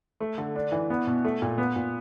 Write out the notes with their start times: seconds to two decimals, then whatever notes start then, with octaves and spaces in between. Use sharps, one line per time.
0.20 A3
0.38 D3
0.56 D4
0.72 E3
0.90 B3
1.07 B2
1.25 A3
1.42 A#2
1.58 B3
1.76 A#2